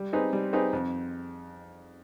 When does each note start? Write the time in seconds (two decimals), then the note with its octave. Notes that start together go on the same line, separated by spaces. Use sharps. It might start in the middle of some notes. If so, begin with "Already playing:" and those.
Already playing: G3
0.13 C4 D#4 G#4 B4
0.33 G3
0.53 C4 D#4 G#4 B4
0.73 F2